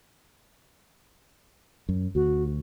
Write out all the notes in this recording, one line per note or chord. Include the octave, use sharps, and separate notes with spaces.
F#2
D2 F#4